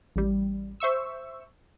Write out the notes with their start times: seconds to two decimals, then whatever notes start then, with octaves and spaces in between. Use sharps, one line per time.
0.16 A1 G3
0.80 C5 E5 C#6 E6